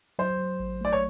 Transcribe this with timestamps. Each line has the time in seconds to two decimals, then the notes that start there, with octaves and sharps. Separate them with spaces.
0.19 F#3 C5
0.39 F#3
0.60 A1
0.81 A3 D5
0.93 C#5